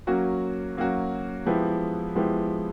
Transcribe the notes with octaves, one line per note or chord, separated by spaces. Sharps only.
F#3 A#3 C#4 F#4
F#3 A#3 C#4 F#4
F3 G#3 B3 E4 G4
F3 G#3 B3 E4 G4